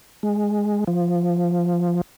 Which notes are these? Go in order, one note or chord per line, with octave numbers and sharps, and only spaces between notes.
G#3
F3